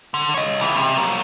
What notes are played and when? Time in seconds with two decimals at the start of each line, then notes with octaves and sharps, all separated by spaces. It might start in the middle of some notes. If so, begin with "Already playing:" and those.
0.14 D3
0.34 C#5 D#5
0.60 C#2 E3
0.76 C3
0.97 F#3 A#3